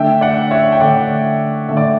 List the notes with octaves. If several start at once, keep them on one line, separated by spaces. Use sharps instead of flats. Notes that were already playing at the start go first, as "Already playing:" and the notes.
Already playing: D3 A3 D4 E5 G5
D5 F#5
C#5 E5
G5
D3 A3 D4 D5 F#5
D3 A3 D4 E5
D5